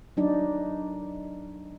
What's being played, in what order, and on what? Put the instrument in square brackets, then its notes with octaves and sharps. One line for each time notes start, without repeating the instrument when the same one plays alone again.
[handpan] F#3 D4 D#4 D5